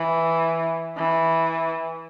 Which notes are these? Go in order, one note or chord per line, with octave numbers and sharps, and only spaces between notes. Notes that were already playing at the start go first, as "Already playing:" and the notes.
Already playing: E3
E3